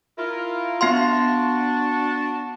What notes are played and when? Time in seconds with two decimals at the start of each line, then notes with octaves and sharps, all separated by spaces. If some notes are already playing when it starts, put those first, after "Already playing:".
0.17 E4 F4 A#4
0.81 B3 D4 F#4 F5 A5 C6